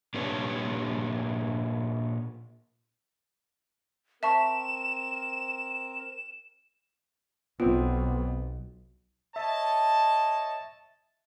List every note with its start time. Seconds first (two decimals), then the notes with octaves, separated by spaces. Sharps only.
0.14 A#2 D4 G4 B4 C#5
4.23 C4 A#4 E5 A5 C#6 E7
7.60 B1 B3 C4 F4
9.36 C#5 D#5 E5 A5